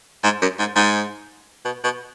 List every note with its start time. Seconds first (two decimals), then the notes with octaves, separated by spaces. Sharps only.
0.24 G#2
0.42 F#2
0.59 G#2
0.76 G#2
1.65 B2
1.84 B2